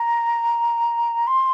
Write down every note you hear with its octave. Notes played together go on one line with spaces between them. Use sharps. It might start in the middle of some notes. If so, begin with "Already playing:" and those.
Already playing: A#5
C6